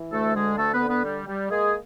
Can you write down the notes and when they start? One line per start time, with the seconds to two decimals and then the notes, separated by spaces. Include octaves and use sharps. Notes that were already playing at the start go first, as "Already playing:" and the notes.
Already playing: E3
0.11 D2 A3 A4
0.35 D3 G#3 G#4
0.57 D2 A3 A4
0.73 B3 B4
0.80 D3
0.88 B3 B4
1.04 G3
1.27 G3
1.50 G#3 A#3 G#4